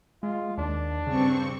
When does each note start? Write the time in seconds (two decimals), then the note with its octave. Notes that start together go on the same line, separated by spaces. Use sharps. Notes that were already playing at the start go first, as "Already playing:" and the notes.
0.23 G#3 F4
0.58 D#2 D4
1.07 G2 C#3 C4 C#6